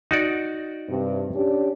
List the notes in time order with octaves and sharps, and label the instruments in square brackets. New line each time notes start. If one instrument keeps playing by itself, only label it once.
[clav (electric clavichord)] D#4 F#4 D5
[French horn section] G2 C3
C#4 D4 G4